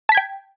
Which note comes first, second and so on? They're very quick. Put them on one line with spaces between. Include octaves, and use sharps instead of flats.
A5 B6 G#6 G5